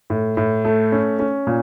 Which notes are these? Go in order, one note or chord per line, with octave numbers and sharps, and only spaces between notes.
A2
A2
A3
C#4
C#4
A#2